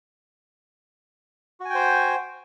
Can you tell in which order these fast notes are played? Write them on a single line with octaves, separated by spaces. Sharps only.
F#4 G#5 G5 C5